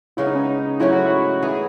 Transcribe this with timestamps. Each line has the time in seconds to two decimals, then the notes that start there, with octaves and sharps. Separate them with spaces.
0.17 C#3 G#3 B3 E4
0.27 D#4
0.35 C#4
0.44 D#4
0.80 G#2 F#3 A3 C#4 E4
0.93 F#4
1.06 E4
1.42 E3 B3 D#4 G#4